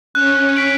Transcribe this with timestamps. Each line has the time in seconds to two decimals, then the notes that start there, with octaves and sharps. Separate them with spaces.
0.14 C#4 F#6
0.56 B6 D7 F#7